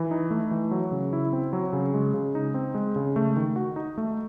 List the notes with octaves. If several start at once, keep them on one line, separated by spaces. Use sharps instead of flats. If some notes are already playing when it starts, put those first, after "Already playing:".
Already playing: E3
D#4
A3
E3
F#3
C#3
E4
C4
F#3
C#3
G#3
C#3
D#4
C4
G#3
C#3
A3
D#3
F#4
D#4
A3